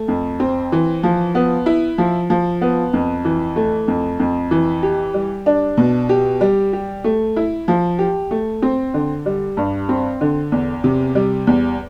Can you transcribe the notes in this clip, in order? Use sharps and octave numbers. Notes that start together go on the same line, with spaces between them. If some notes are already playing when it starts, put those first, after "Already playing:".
Already playing: A3
F2
C4
E3
F3
B3
E4
F3
F3
B3
F2
E3
A3
F2
F2
E3
G4
G3
D4
B2
G4
G3
G4
A3
E4
F3
G4
A3
C4
D3
G3
G2
C4
D3
E2
C3
G3
E2